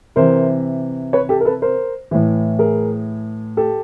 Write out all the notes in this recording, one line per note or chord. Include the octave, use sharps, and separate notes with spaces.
C3 E3 A#4 C5
B4 C#5
G4 A4
A#4
A4 B4
A#4 C5
A2 E3
G#4 A#4
G4 A4